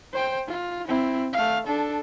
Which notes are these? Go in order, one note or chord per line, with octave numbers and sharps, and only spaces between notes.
C5 G5
F4
C4 E4
A3 F5
D4 A4